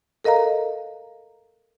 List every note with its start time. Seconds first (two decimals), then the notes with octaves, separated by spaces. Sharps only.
0.24 A4 A#4 D#5 F5 A#5